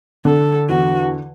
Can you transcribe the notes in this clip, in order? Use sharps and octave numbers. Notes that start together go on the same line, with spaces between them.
D3 A4
E2 F#4